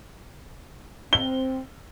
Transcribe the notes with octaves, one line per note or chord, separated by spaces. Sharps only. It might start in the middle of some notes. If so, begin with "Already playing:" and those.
C4 G7